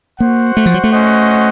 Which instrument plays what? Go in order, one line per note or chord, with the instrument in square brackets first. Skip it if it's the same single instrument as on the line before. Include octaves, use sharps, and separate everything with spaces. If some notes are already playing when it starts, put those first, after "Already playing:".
[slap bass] A#3 [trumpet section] F#4 C5 F#5
[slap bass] A3
F3
F#3
A3
[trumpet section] C#4 F#4 C5 D#5 F#5